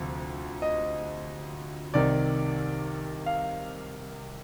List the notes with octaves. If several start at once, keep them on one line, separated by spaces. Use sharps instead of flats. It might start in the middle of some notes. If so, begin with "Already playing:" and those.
Already playing: D2 C3 F3
D#5
C2 C3 D#3 D5
F5